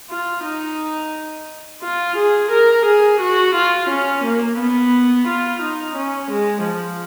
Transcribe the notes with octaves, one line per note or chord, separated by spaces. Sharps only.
F4
D#4
F4
G#4
A#4
G#4
F#4
F4
C#4
A#3
B3
F4
D#4
C#4
G#3
F3